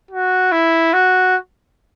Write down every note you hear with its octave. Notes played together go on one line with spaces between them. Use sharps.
F#4
E4
F#4